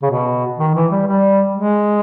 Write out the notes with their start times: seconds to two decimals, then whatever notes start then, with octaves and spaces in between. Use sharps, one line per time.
0.02 C#3
0.11 B2
0.59 D#3
0.75 E3
0.91 G3
1.07 G3
1.55 G#3